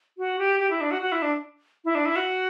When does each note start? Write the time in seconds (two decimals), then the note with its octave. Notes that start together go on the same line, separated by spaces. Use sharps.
0.18 F#4
0.39 G4
0.60 G4
0.70 E4
0.81 D4
0.91 F#4
1.01 F#4
1.12 E4
1.22 D4
1.85 E4
1.95 D4
2.05 E4
2.16 F#4